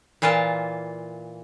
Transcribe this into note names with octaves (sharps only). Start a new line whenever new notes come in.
A#2 E3 F4 A#4 A5